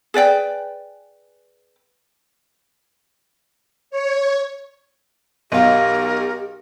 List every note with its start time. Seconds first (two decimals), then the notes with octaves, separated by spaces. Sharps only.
0.14 G#4 B4 D5 G5
3.90 C#5
5.52 B1 G4 A#4 D#5 F5